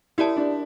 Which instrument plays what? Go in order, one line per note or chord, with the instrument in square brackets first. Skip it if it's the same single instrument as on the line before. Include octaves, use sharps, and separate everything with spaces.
[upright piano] E4 [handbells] G4 A#4 D5 A5
[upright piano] D4